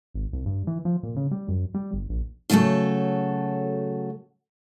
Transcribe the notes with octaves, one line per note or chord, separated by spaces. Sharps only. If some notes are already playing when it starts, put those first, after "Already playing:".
G#1
C2
G2
E3
F3
A#2
C#3
G3
F#2
G3
G1
A#1
C#3 F#3 A3 F#4 A4